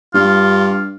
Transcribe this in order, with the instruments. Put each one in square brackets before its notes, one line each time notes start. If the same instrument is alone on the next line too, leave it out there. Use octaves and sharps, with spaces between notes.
[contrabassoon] G2 [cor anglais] F4